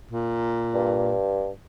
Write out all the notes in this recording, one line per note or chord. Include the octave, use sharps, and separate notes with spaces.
A#2
G2